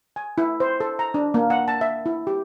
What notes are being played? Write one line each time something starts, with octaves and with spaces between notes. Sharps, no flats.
G#5
E4
C5
A4
A#5
D4
A#3
F#5
A5
E5
E4
G4